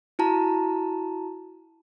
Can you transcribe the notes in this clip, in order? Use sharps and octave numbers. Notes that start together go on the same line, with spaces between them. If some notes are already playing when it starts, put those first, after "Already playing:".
E4 F#4 A5 A#5